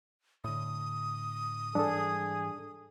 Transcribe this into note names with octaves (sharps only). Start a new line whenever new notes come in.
A2 D3 D#6
G#2 E3 G3 D4 G#4 A4